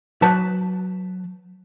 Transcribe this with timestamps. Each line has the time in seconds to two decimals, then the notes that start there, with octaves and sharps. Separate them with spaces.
0.22 F#3 B4 A5